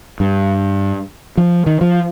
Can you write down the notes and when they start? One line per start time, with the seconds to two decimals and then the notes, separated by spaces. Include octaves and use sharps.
0.20 G2
1.37 F3
1.66 D#3
1.81 F3